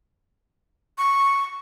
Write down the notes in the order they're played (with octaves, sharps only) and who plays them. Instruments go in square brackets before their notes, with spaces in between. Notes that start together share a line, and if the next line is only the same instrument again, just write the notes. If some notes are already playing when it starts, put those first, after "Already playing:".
[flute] C#6